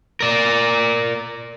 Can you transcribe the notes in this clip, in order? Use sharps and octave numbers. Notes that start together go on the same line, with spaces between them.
A#4 D5